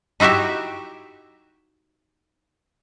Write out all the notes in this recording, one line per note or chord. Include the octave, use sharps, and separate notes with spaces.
D#4 E4 F#4 G4 E5